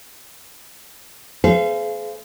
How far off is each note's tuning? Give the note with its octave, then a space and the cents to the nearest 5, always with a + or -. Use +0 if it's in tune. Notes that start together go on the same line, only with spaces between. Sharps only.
G#4 +40 C5 -30 F5 -35